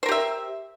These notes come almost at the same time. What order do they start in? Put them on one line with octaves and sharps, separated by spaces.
C5 A#4 G4 E5